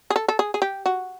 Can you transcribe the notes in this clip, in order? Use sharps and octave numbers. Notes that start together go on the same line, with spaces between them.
G#4
A4
A4
G#4
G#4
G4
F#4